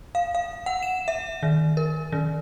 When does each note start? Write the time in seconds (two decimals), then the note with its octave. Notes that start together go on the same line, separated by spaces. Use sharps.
0.15 F5
0.35 F5
0.66 F#5
0.83 E7
1.08 E5
1.43 D#3
1.77 A#4
2.12 D#3